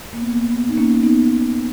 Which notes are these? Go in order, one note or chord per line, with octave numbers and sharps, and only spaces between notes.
A#3
B3
A#3
B3
D#4
A#3 C#4
B3 D#4